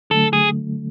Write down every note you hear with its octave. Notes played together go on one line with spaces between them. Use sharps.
D3 F#3 A3 A4
G#4